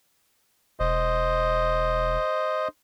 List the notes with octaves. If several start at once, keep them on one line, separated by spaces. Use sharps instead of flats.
E1 C5 D#5